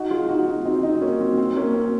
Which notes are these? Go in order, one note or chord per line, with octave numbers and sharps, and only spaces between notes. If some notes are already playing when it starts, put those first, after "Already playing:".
Already playing: D#4 F#4
F4 G#4
D#4 F#4
D#4 F#4
C4 D#4
C4 D#4
A#3 C#4
C4
C4
A#3 C#4
C4